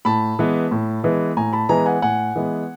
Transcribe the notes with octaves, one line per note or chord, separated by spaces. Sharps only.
A2 A5 B5
E3 G#3 B3
A2
E3 G#3 B3
A2 G#5 A#5
A5 B5
E3 G#3 B3 G#5 A#5
F#5 G#5
A2 F#5 G#5
E3 G#3 B3